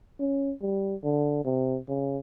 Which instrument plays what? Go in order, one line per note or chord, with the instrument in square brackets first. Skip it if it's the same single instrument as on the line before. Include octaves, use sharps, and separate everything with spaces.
[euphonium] C#4
G3
D3
C3
C#3